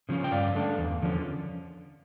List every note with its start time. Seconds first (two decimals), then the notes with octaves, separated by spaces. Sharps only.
0.09 C#3 F3 A3 C#4
0.24 G5
0.32 G2 D5 F5
0.55 D3 A3 D4
0.79 E2
1.02 D3 F3 C#4